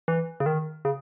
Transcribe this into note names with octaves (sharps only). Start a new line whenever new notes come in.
E3
C#3
D#3
C#3